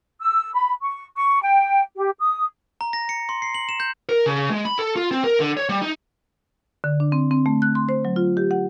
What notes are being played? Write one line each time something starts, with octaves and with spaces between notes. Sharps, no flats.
E6
B5
C#6
C#6
G5
G4
D#6
A#5
A#6
C#7
C6
C7
F#7
E7
G6
A#4
C#3
G#3
B5
A4
F4
C4
A#4
D3
C#5
G3
D#4
D3
D4
C4
C4
A3
F#6
C6
C5
F#3
F4
G4
F#5